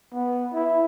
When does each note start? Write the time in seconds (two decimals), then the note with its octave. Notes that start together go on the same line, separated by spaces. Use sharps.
0.14 B3
0.54 E4